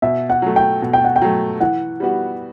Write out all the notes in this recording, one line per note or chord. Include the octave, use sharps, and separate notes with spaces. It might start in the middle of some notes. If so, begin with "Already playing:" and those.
B2 E5
F#5
F#3 A3
G5
B2
G5
F#5
G5
F#3 A3
E3 F#5
G3 B3 F#4